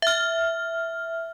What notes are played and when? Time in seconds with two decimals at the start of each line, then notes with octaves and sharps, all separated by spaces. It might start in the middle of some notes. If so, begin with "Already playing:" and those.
0.02 E5 F6